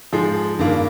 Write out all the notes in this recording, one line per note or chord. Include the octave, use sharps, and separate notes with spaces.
G#2 F3 G#3
G2 D#3 A#3